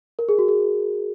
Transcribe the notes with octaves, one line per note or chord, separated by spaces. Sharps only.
A#4
G#4
F#4
G#4